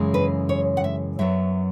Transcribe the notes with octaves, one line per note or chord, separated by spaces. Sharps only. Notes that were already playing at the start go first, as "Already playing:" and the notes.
Already playing: F#2 C#3 E3 G#3 C#4
B4
C#5
F#5
E5
F#2 F#3 B3 E5